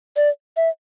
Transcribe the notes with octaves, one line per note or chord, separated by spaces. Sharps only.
D5
E5